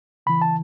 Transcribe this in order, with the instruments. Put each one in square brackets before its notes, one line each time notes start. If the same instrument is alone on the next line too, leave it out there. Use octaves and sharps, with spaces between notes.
[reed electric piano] C#3 E3 B5
A5